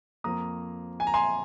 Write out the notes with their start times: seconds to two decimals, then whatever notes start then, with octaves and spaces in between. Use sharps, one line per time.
0.24 F2 F3 A#3 A#5 D#6
1.00 G#5
1.07 A#5
1.14 G#5 C6